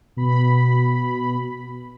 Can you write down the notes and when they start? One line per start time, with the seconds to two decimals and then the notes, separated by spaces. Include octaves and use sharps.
0.17 B2 B5